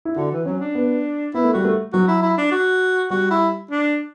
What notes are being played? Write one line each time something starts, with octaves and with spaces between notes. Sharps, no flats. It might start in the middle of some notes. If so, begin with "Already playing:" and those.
E4
D3 F#4
E3
F#3 C#4
D4
B3
B3 E4
A3
G3 F#4
A3
F#3 F#4
E4
E4
D4
F#4
G3 F#4
E4
D4